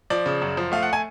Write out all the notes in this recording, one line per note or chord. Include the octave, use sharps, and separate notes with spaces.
F3 D5
C#3
F#2
F3
A3 F5
F#5
G#5